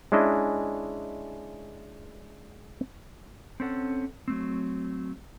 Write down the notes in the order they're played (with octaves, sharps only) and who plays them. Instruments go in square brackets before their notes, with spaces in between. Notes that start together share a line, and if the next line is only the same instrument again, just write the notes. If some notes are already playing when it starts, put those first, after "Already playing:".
[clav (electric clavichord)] G#3 C#4 D4 E4 D#5
[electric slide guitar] C4 C#4 A4 F#5
F#3 A3 C4